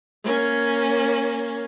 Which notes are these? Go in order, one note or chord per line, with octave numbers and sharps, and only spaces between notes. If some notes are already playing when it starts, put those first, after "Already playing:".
A#3 C#4